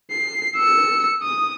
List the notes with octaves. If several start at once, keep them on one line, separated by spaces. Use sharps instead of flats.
C7
E6 C#7
D#6